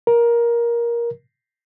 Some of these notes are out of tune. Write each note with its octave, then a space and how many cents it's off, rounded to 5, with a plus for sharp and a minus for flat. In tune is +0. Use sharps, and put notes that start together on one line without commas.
A#4 +15